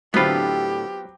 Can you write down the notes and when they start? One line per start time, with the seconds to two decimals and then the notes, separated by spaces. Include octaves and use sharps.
0.14 A2 D3 F#3 B3 C4 F4 G4 B5